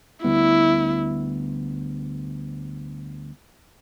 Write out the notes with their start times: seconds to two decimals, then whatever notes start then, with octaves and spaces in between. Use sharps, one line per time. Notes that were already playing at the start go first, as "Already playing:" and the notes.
0.24 D2 D3 G3 B3 E4